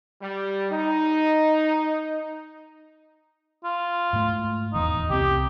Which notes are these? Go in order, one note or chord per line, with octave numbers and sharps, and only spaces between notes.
G3
D#4
F4
G#2 A3
D#1 E2 D#4
C2 C4 G4